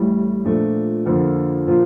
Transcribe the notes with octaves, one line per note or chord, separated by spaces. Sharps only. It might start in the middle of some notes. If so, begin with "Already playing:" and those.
Already playing: A1 A2 G3
A#2 F3 A3 D4
F2 D3 F3 A#3
A#2 F3 A#3 F4